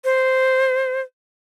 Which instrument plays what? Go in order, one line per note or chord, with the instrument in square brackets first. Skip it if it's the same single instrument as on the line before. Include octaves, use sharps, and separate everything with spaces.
[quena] C5